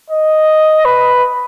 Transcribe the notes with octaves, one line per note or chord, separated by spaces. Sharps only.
D#5
B4